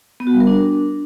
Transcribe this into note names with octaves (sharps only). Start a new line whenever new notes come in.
B3
F#4
G3
A#4
D4